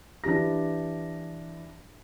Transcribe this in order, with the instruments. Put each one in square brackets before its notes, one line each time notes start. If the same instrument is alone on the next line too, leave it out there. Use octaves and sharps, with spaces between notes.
[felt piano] E3 D4 G4 A#6